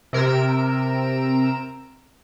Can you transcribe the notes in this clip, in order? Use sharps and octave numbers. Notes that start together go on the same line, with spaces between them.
C3 A#4 E6 D7